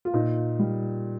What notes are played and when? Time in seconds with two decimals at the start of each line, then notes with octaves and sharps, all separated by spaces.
0.05 F4
0.14 A#2 D#4
0.59 G3